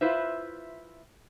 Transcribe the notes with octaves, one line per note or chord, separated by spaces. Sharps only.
E4 F4 B4 C5 E5